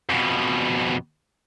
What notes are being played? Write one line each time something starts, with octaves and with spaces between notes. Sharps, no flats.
F2 B2